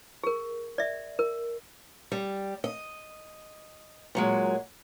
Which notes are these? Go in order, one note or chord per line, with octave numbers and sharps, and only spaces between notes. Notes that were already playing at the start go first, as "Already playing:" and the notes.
G#4 A#4
D5 E5
A#4
G3
D#5
A#2 F#3 G#3